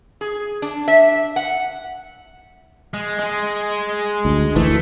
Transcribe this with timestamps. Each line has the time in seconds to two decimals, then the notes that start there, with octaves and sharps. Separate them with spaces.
0.21 G#4
0.62 D4
0.88 E5
1.36 F#5
2.94 G#3
3.19 G#3 G#4
4.25 D2
4.56 D2 E3 A3